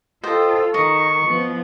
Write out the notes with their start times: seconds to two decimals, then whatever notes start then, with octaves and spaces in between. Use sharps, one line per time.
0.23 F4 A4 C5 D#5 G5
0.74 D#3 D#5 C#6
1.25 F3 B3